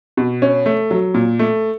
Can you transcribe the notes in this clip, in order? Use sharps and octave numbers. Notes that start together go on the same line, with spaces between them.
B2
C#4
A3
F#3
A#2
A3